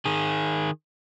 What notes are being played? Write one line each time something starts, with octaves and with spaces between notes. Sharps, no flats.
D#3 G#4